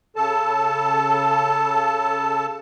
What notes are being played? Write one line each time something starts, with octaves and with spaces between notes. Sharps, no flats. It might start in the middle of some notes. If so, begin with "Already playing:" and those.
C#3 A4 A5